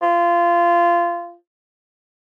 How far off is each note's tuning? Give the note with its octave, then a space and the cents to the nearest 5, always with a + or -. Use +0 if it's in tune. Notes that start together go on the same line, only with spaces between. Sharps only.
F4 -20